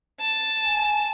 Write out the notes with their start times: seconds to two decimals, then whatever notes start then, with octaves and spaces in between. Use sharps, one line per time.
0.20 A5
0.64 G#5